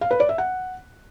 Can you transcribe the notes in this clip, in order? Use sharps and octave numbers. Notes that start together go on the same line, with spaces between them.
F5
B4
D5
E5
F#5